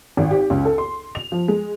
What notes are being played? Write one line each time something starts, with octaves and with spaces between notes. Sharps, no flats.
G#1
G4
C#2
A4
C6
F7
F3
G#3